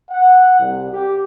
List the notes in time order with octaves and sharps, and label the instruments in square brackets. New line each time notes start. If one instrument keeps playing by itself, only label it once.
[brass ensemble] F#5
C2
G4